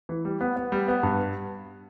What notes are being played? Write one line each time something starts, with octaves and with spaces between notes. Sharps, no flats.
E3
G3
B3
B3
G3
B3
G2